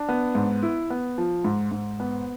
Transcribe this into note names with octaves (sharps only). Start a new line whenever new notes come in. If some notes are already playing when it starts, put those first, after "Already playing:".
Already playing: D4
B3
G#2
E4
B3
F3
G#2
G#2
B3